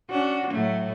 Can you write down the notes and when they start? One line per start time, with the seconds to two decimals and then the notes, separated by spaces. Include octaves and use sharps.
0.10 C#4 D4 F#4
0.50 A2 F#3 A3